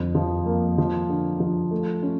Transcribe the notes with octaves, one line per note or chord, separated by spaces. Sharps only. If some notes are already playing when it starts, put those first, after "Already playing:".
Already playing: F2 D3
F3
A#3
F3
D3
F3
A3
C#4